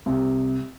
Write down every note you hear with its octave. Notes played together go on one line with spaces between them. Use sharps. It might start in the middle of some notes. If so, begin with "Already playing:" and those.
C2